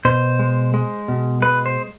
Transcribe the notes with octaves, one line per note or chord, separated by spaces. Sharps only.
B2 C5
G#3
G#3
B2
G#3 B4
C5